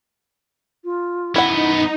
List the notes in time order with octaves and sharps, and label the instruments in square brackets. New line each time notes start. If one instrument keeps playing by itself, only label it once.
[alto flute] F4
[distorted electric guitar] F#2 B3 [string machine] D#4 [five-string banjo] E4 F#5 [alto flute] B5